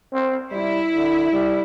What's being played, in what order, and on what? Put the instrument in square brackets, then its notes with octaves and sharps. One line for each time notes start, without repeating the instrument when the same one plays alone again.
[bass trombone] C4
[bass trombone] G3 [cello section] E4
[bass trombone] D3
G3